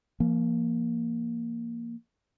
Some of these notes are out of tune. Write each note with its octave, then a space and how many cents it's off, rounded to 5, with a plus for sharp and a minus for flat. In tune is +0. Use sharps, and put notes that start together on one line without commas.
F3 -40 A#3 +0